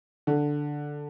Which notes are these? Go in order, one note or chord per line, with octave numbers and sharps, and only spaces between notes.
D3